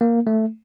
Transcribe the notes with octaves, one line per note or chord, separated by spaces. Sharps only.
A#3
A3